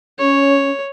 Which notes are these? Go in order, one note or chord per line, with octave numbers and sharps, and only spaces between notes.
C#4 C#5